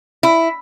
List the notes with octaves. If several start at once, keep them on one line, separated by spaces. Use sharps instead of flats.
E4